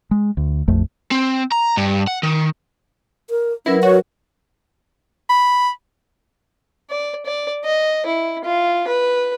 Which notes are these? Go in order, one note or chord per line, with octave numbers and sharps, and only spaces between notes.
G#3
D2
A#1 F2 A3
C4
A#5
G2
F#5
D#3
A#4
F#3 C#4 E4 A#4 B4
F#4 C#5
B5
D5
D5
D#5
E4
F4
B4